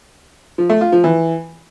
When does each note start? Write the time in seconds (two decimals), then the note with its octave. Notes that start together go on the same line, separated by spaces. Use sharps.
0.58 F3
0.70 A3
0.81 F4
0.92 F3
1.04 E3